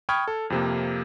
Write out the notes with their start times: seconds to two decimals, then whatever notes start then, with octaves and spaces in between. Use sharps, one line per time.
0.09 G5 B5 C#6 D#6 F6 G#6
0.28 A4
0.50 F2 C3 A#3